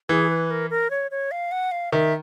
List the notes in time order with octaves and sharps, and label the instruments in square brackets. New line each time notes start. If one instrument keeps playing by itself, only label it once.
[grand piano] E3 [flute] G#4
[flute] B4
A#4
A#4
C#5
C#5
F5
F#5
F5
[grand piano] D#3 [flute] E5